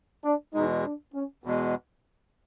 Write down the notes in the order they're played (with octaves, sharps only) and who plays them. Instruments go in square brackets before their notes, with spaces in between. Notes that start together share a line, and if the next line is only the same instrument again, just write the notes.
[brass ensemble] D4
[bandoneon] E2 B2 G#3 [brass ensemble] D#4
[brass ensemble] D4
C#4
[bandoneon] E2 B2 G#3